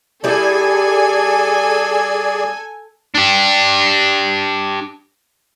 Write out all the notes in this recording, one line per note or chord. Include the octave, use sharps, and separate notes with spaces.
G3 E4 G#4 A4 D5 G#5
D4 G4